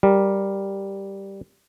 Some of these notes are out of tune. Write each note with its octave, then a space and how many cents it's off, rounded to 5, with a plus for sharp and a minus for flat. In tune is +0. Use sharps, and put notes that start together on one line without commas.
G3 +0 A#4 +0